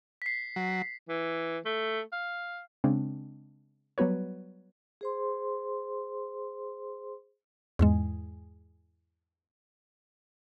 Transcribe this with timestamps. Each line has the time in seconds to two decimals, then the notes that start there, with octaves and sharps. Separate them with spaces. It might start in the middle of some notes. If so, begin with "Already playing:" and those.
0.22 B6 C7
0.56 F#3
1.09 E3
1.65 A3
2.12 F5
2.84 C#3 G#3 C4 D4
3.98 F#3 G3 B3 F#4 B4 C#5
5.01 G#4 C5 C6
7.79 E2 G#2 G#3